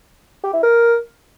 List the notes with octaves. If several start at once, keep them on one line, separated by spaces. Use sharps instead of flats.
G4
E4
A#4